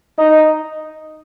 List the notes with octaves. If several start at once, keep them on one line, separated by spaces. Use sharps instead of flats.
D#4